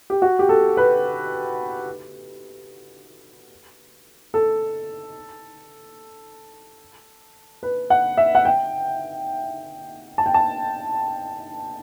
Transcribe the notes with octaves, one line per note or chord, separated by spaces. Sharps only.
G4
F#4
G4
A4
B4
A4
B4
F#5
E5
F#5
G5
A5
G5
A5